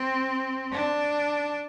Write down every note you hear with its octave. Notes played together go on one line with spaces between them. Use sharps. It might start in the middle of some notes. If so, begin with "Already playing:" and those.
Already playing: C4
D4